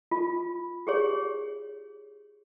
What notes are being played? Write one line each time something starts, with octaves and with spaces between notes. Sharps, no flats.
F4
G4 G#4 C#5